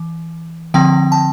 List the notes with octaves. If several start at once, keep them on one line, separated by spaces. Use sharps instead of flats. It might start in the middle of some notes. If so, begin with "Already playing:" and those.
Already playing: E3
D3 F3 C4 G5
A5